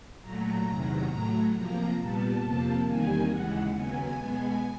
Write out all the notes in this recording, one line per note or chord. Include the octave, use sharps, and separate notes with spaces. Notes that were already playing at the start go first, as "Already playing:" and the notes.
A#2 F#3 A3 A#5
E2 C3 D#3 F#3
A2 F#3 A3
C3 F3 A#3 A#5
A#2 G3 B3 A5
F2 C3 F3 A#3
E2 C3 D#3 G3 A#3 G#5
D#2 C#3 E3 G#3 F#5
D#2 C#3 F#3 B3 G#5
B2 G#3 B3